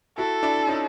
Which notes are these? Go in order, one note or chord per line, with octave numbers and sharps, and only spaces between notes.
E4 F#4 A4
D4 E4
C#4 D#4